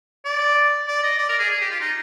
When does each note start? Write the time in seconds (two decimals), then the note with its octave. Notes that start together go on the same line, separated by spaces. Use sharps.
0.25 D5
0.88 D5
1.03 D#5
1.18 D5
1.29 A#4
1.39 G#4
1.50 G#4
1.61 G4
1.71 F4
1.81 D#4